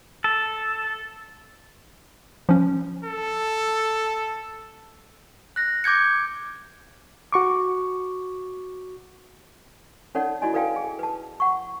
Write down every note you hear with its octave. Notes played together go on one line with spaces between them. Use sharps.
A4
F3 C#4
A4
F#6 A#6
D6 G6 G#6 C#7
F#4 C#6 D6
C#4 D#4 A4 C#5 D5 F#5
E4 F#4 D5 D#5 G#5
A4 B4 D5 F5 G5 G#5
G#4
B4 A5
F#5 C#6